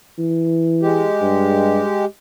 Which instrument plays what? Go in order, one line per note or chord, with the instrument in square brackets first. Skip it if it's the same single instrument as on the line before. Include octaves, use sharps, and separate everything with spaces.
[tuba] E3
[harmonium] G#3 G4
[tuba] G2